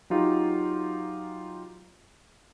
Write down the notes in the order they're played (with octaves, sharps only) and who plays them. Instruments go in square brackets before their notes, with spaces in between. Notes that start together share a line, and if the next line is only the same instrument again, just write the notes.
[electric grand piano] F#3 D#4 F4 G4